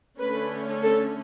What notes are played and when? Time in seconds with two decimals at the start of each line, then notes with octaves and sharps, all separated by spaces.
0.18 D3 A3 C#4 B4
0.82 A4